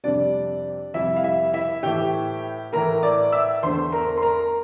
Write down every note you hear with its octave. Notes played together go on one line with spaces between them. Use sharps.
F2 C3 G3 D4 D5
F2 C3 G3 E4 E5
F5
E4 E5
E4 E5
A2 E3 A3 G4 G5
A2 E3 A3 A#4 A#5
D5 D6
E5 E6
E2 D3 A3 C5 C6
A#4 A#5
C6
A#4 A#5